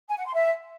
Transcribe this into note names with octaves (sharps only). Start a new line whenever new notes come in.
G#5
F#5
C6
E5